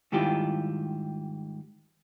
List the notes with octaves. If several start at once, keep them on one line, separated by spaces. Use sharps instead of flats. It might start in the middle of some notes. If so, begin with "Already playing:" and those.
G#2 D#3 G3 E4 F4 G4